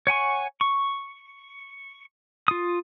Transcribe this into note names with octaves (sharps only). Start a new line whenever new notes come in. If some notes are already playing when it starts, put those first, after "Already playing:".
C#5 F#5 G#5 C#6
C#6
F4 D#6